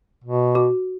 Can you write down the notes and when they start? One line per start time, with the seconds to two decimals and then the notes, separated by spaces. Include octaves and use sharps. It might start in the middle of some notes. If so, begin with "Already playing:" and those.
0.24 B2
0.55 F#4